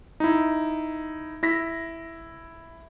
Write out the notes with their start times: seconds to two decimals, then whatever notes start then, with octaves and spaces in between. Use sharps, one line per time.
0.20 D#4 E4
1.43 E4 A#6 B6